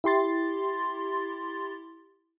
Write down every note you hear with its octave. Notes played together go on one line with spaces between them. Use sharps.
E4 G4 C6 A6